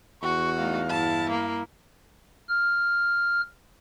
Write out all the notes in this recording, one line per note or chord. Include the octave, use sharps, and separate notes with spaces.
E2 F#4 C#6
A3 D#4 F5
G2 E4 A5
A#3
F6